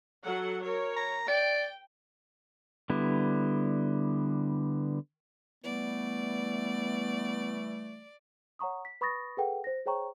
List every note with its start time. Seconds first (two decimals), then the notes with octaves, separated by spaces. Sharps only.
0.24 F#3 A4 F#5
0.64 A#4 C#5
0.97 A#5
1.28 D5 G5
2.90 D3 G3 B3 E4
5.64 E3 G3 A3 B3 D5
8.59 C#5 F#5 A#5 C#6 D#6
8.85 B6
9.01 B4 B5 C#6 D#6 A6 A#6
9.37 G#4 A4 B4 F#5 G5
9.64 C5 A#6
9.86 G#4 C5 C#5 G5 A#5 C#6